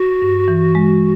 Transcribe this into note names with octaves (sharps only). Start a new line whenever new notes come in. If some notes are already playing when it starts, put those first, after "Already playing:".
Already playing: F#4
G2
E3
G#3